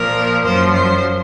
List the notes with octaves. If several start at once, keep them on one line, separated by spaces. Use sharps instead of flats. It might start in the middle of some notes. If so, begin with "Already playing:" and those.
Already playing: A#2 F3 A#4
F#2 F3 C5
C5